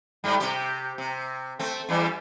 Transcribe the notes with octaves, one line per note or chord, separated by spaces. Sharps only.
G#2 G3
C3 G4
C3
A3 C4
E2 E3 G3